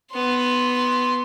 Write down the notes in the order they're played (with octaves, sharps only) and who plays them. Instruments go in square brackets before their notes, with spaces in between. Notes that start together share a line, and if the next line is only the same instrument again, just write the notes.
[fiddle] B3 C6